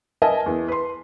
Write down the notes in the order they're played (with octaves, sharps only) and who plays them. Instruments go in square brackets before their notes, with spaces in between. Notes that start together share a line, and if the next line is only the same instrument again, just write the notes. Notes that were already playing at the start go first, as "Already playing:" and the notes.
[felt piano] A#4 B4 D#5 E5 G#5 A5
E2
B4 C6